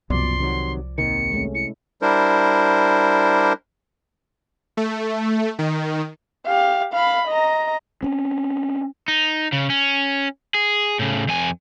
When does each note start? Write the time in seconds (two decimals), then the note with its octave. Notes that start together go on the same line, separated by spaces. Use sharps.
0.10 C2 F#2 B2 F3 D5 C6
0.40 C3 D#3 F#3
0.98 G#1 D#2 C3 D#3 C#7
1.32 G#3 A3 C#4
1.55 E4 C#7
2.02 G3 D4 E4 A#4 C5
4.77 A3
5.59 D#3
6.47 G4 F5
6.94 F5 B5
7.28 D#5 A#5
8.03 C4 C#4
9.08 D#4
9.52 C#3
9.70 C#4
10.54 G#4
10.99 A2 C#3
11.28 F2 G#5